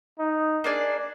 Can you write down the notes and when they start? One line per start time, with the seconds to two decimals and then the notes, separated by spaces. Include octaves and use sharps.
0.19 D#4
0.64 A#3 D4 G#4 D5